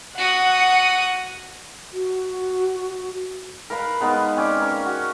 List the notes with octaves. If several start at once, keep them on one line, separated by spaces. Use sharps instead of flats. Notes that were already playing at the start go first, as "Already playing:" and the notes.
F#4 F#5 D#6
F#4
A#4 B4 F5 B5
G#3 B3 D#4
C4 C#4 D5
A#3 C#4
F#4